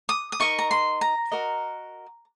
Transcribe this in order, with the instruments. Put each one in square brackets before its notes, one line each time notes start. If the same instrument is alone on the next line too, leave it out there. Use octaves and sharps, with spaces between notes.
[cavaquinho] D#6
D#6
D#4 A#4 D#5 C#6
A#5
C6
A#5
F#4 A#4 D#5